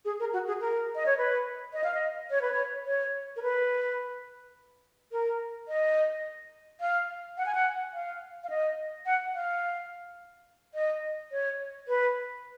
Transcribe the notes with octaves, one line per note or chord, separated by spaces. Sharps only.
G#4
A#4
F#4
G#4
A#4
D#5
C#5
B4
D#5
F5
D#5
C#5
B4
C#5
C#5
A#4
B4
A#4
D#5
F5
F#5
G#5
F#5
F5
F5
D#5
F#5
F5
D#5
C#5
B4